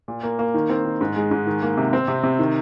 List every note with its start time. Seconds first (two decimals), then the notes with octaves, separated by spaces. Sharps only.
0.08 A#2
0.23 A#3
0.39 A#3
0.54 D#3
0.70 C4
0.85 D#3
1.01 G#2
1.16 G#3
1.31 G#2
1.47 D#3
1.62 A#3
1.77 C3
1.93 C4
2.08 C3
2.23 C3
2.39 D#3